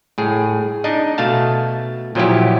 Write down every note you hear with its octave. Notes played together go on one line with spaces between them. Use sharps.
A2 G#4
D4 D#4 D#5
B2 A3 F5 A5
A#2 F3 F#3 B3 E4 G4